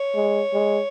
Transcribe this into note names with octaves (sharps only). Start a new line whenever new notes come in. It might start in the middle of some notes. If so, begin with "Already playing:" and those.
Already playing: C#5
G#3
G#3